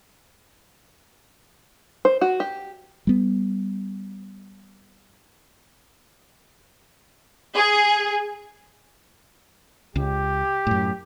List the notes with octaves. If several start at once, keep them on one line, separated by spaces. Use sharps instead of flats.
C5
F#4
G4
G3 B3
G#4
C#2 G4
F#2 A2